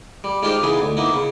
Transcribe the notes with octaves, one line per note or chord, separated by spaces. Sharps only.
G3
G#3 D#4 F4 G4 C5 F5
C#3 E3 B3 D#4 G#4
D2
A#3 B3 D#4 E4
C#3